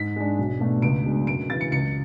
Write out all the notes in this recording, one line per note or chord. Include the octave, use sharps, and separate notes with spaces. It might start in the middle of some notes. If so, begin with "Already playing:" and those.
Already playing: G#2 B6
G#3 D4
B1
B2 A3 D4
C#2 D7
B2 G#3 D4
F#2 D7
C#3 E3 A6
C#7
C#2 C#7